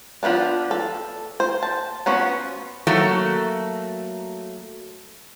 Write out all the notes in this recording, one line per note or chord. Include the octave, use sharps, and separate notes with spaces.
F3 F#3 B3 D4
A4
C5
A5
F3 B3 C#4 F#4
F#3 A3 A#3 F#4 A4